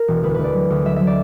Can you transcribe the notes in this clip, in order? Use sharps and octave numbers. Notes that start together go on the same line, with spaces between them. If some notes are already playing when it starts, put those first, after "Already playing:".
Already playing: A#4
E1
D2 B4
D2 B4
D5
F#3
D2
F#3 E5
F#3 E5
D5